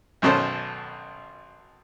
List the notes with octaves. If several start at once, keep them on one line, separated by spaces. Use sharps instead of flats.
G#1 F#2 B2 C#4 A4 C5